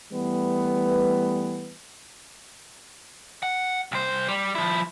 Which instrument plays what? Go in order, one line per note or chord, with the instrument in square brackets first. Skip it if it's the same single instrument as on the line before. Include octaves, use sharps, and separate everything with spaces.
[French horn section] E3 G3 A3 B3 B4
[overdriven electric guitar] F#5
C2 C5
G3
F3 E4